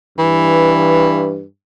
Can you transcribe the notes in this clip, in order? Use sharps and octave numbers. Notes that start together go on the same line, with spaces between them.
G2 E3